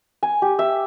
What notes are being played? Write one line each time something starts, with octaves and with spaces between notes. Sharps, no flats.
G#5
G4
E5